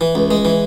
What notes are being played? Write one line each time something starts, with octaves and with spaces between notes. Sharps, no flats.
E3
C#2
G#3
E3